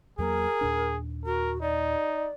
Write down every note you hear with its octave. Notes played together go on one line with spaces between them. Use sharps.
E2 F#3 A#3 G#4 A#4
D#2 A#2 D4
F#4 A#4
D#4 D5